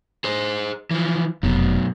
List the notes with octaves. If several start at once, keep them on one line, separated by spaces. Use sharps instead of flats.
G#4 C5
E3 F3
F1 F#2 B2